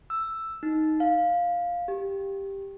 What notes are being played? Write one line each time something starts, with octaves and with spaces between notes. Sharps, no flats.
E6
D#4
F5
G4